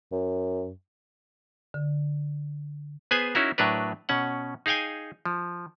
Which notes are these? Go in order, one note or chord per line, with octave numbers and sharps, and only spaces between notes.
F#2
D3
B3 G#4 B4 C5 G#5
C#4 D#4 E4 F#4 A#4
A2 F#3 D4 A#4 B4
B2 C#4 F#5
D#4 G#4 F5 G5 G#5
F3